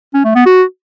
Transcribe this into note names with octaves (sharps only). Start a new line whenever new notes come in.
C#4
A3
B3
F#4